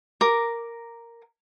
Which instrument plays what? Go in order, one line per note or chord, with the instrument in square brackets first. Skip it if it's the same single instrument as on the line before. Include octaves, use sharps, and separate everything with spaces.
[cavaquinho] A#4 D6